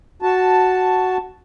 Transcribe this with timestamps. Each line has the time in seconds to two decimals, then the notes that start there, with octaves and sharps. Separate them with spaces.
0.22 F#4 A5